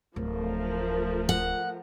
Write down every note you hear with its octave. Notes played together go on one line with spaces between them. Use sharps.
D1 F3 A3 A#4
F#5